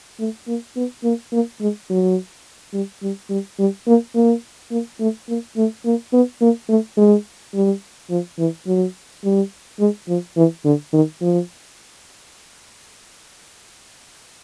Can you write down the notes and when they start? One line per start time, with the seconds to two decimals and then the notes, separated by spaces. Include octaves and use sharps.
0.20 A3
0.48 A#3
0.76 B3
1.04 A#3
1.32 A#3
1.61 G#3
1.90 F#3
2.73 G3
3.03 G3
3.30 G3
3.59 G3
3.87 A#3
4.15 A#3
4.71 A#3
5.00 A3
5.28 A#3
5.57 A3
5.85 A#3
6.13 B3
6.41 A#3
6.69 A3
6.97 G#3
7.54 G3
8.10 F3
8.39 E3
8.67 F#3
9.24 G3
9.80 G#3
10.08 F3
10.37 E3
10.65 D3
10.93 D#3
11.21 F3